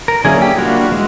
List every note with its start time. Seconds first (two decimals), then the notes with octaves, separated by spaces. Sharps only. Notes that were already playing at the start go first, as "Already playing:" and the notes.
0.08 A#4
0.24 D3 F#3 A#3 C#4 E4 G#4
0.42 G4
0.58 G3 A#3 D4 F4 F#4
0.91 E3 G#3